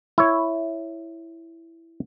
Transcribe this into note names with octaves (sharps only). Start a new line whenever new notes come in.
E4 C#5